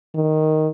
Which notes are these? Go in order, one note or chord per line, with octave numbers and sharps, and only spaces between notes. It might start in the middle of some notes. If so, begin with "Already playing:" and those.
D#3